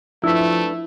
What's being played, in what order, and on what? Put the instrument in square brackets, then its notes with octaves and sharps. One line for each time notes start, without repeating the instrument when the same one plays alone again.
[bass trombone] F3 [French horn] A3 [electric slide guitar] D4 B4 [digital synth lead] E4